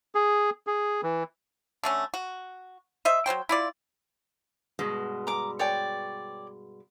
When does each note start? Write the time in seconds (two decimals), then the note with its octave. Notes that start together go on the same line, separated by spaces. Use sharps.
0.15 G#4
0.67 G#4
1.03 E3
1.83 D3 A3 C#4
2.14 F#4
3.05 C5 D#5 E5
3.26 F#3 G3 C5 G5
3.49 E4 F4 D5
4.79 G2 B2 G#3
5.27 A#5 D6
5.59 C#5 D5 G5